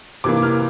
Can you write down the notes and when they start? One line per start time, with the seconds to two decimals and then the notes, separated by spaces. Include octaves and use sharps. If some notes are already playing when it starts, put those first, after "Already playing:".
0.24 C3 E3 A#3 D6
0.42 F6